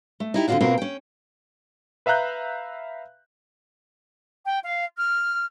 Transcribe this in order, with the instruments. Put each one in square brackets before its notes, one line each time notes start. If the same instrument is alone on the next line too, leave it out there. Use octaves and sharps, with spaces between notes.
[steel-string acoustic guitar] A3
D#4 E4 G4
D3 C4 D4 D#4 F4 F#4
B2 A#3 C4 F4 F#4 A#4
C#4 G5
[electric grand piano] B4 E5 F5 A#5 F#6 G6
[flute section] G5
F5
F6